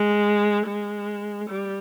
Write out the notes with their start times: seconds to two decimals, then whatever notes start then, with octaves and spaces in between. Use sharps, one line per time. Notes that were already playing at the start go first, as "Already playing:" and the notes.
Already playing: G#3
0.66 G#3
1.48 G3